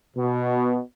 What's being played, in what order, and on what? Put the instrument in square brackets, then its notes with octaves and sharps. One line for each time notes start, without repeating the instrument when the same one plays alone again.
[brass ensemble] B2